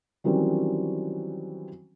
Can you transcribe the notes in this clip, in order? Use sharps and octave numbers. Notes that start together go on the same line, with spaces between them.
D#3 E3 F#3 G3 C4 C#4